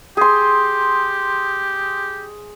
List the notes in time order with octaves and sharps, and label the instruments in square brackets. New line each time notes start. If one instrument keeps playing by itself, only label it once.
[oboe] G4 [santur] G#4 C6